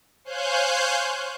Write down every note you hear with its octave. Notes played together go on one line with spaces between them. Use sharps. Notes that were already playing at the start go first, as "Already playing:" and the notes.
C5 C#5 F5 G#5 F#6 G6